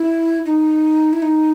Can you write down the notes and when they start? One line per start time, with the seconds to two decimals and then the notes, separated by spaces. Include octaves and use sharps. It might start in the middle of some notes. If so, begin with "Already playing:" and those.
Already playing: E4
0.46 D#4
1.13 E4
1.22 D#4